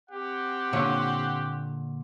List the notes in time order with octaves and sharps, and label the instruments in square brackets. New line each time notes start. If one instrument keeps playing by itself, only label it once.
[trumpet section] C4 G4 F#5
[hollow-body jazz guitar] A#2 D3 C#5